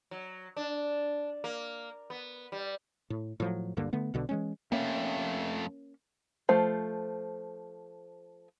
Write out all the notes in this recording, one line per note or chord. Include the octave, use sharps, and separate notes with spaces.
F#3
D4
A#3
B3
G3
A2
A2 F3 F#3
D1 G2 D3 A#3
D3 A3 B3
B1 B2 D3
E3 G#3 C#4
F2 A3 A#3 C#4
F3 A3 C5